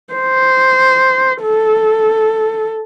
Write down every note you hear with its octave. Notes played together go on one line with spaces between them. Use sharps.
C5
A4